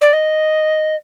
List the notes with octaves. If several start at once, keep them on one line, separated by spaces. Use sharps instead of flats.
D5
D#5